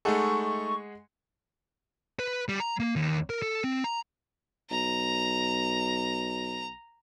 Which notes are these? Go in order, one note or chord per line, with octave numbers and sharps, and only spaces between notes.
G#3 A3 D#4 G#4 A4 F#5 C#6
B4
G3
A#5
A#3
D#2
A#4
A4
C4
A#5
B1 A#5